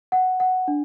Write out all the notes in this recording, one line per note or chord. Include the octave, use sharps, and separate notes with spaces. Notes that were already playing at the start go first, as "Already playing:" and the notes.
F#5
F#5
D4